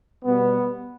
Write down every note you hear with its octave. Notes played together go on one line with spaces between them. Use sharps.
B2 G3 B3